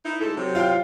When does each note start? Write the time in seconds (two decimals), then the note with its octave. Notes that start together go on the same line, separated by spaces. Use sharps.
0.05 D#4 E4
0.20 D2 G#2 A4
0.37 C3 F#3
0.55 F4 F5 G5